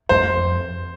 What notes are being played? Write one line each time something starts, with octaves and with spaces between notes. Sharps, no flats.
F2 C5